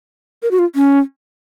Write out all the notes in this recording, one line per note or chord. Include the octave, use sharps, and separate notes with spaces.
A#4
F#4
F4
C#4